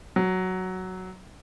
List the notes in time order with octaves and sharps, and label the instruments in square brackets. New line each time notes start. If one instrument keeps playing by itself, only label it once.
[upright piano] F#3